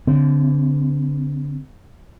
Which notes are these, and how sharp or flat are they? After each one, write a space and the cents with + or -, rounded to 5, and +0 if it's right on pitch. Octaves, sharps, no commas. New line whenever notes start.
D3 -30 C4 -35